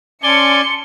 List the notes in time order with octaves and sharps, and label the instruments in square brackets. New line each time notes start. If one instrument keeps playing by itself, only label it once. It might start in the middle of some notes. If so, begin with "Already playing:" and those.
[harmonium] C#4 [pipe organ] D5 G#5 [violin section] A5 C6 C#7 [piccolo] G7